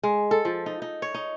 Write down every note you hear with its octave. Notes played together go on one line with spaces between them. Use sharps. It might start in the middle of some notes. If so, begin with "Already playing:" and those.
G#3
A4
F3
D#4
D#4
C#5
D#4